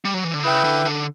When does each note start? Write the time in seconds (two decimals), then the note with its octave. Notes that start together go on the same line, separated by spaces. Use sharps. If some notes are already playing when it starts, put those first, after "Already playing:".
0.05 G3
0.14 F#3
0.24 E3
0.34 D3
0.44 C#3 E4 B4 E5 G5
0.64 D3
0.85 D3